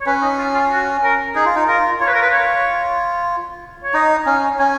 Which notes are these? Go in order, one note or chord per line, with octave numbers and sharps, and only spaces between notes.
C#5
C#4 B4
D#4
F4
F4
F#4
A#4
D#4 G#4
F4
D#4
F4 A#4
F4 C#5
B4
A#4
B4
C#5
C#5
D#4 D#5
C#4 F5
C#4 G#5